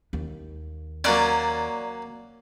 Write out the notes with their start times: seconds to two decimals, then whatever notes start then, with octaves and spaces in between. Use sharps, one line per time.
0.13 D#2
1.04 F#3 A#3 C#4 D5 F#6